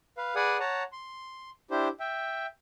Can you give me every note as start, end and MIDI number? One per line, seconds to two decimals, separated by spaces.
0.17 0.35 71
0.17 0.35 77
0.35 0.58 68
0.35 0.58 71
0.35 0.58 74
0.35 0.58 78
0.35 0.58 80
0.35 0.58 87
0.60 0.83 73
0.60 0.83 78
0.60 0.83 81
0.60 0.83 82
0.92 1.50 84
1.71 1.88 62
1.71 1.88 64
1.71 1.88 67
1.71 1.88 72
2.00 2.46 76
2.00 2.46 79